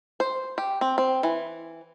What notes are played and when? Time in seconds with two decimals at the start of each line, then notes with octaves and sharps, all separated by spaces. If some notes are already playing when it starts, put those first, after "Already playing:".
0.20 C5
0.58 G4
0.81 C4
0.98 C4
1.23 E3